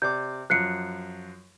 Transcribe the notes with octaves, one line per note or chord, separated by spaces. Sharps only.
C3 D5 D6 G6
F#2 F3 F#6 C7 C#7